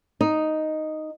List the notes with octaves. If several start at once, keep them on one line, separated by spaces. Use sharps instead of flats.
D#4